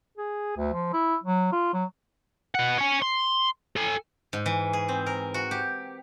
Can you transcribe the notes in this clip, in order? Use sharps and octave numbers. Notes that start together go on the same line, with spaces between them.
G#4
D2
F3
E4
F#3
F4
F#3
B2 F#5
C#5 G#5
C6
A4 G#5
G#2
E3
G#4
C4
A#4
F#4
G4